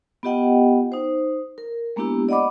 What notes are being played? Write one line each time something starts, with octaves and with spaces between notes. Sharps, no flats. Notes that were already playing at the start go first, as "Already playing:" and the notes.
B3 F4 G4 D#5 F#5 G5
D#4 C5
A#4
G#3 A#3 B3 D4 E4 G4
D5 D#5 F#5 B5 D6